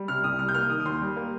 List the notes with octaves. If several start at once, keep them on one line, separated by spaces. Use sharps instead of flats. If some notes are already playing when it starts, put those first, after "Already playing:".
Already playing: G3
C3 F6
C2 D#6
G3 F6
G6
A#3 F6
D#3 D#6
D#6
D#2 C6
G3
A#3